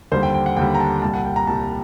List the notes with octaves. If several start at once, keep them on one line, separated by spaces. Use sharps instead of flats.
D#2 D3 G3 C5
G5
G5
F#5
D#2 D3 G3 G5
A#5
A5
C2 A#2 G3 A5
F#5
G5
A#5
C2 A#2 G3 A5